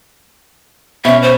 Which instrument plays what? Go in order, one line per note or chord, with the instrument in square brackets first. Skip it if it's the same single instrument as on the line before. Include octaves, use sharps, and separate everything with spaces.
[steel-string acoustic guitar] B2 C#4 [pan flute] E5
[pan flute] C5